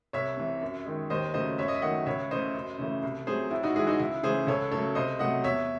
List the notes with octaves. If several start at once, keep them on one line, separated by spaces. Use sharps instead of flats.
C2 C#5 E5
C3 E3
F#2
D#3 G#3
D#2 C5 D#5
C#3 F#3 A3 C5 D#5
F#2 C#5 E5
D#5
E5
D#3 F#3 A3 D#5 F#5
C#2 C#5 E5
C#3 E3 A3 C5 D#5
F#2
C#3 E3 A3
C2
C3 F#3 A3 G#4 C5
A2 E4
D#4 F#4
E3 G#3 E4 G#4
D#4 F#4
C#2 E4
C#3 E3 A3 G#4 C5
C#2 A4 C#5
C#3 F#3 A3 A4 C#5
C2 C5 D#5
C3 F#3 A3 D#5 F#5
E2 C#5 E5